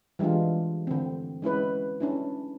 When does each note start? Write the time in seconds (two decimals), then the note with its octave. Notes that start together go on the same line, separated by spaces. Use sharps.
0.19 E3 G3 G#3 D4 F4
0.87 D3 C4
1.42 G#3 C#4 E4 B4
2.00 C#4 D4 E4